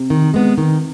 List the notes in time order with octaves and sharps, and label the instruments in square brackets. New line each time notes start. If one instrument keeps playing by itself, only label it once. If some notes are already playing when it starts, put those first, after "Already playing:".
Already playing: [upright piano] C3
[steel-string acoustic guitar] D#3
G#3 B3
D#3